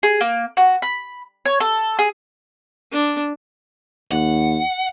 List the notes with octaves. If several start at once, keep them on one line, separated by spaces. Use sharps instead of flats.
G#4
A#3
F#4
B5
C#5
A4
G#4
D4
D#2 F#5